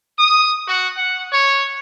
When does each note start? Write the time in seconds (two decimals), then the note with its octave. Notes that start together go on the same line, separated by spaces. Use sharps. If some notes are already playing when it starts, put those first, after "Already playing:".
0.18 D#6
0.68 F#4
0.97 F#5
1.32 C#5